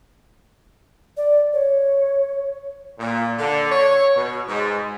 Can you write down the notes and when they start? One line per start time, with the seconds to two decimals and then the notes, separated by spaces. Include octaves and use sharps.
1.17 D5
1.53 C#5
2.98 A#2
3.39 D3
3.71 C#5
4.16 B2
4.48 G#2